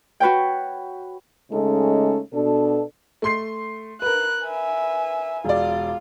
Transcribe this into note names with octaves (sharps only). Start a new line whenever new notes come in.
F#4 B4 C#5 G5
C#3 G#3 A3 C#4 D#4 A4
B2 D4 A4
A3 C6 C7
A#4 B4 F#6
E5 G#5
E1 F4 D5